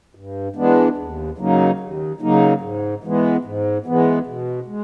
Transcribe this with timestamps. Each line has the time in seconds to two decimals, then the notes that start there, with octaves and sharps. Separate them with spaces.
0.15 G2
0.56 E3 G#3 B3 D4
0.97 D#2
1.38 C#3 F#3 A#3 D#4
1.80 D#2
2.20 C#3 F#3 A#3 D#4
2.61 G#2
3.04 E3 G#3 B3
3.45 G#2
3.86 E3 G#3 B3
4.27 B2
4.68 G#3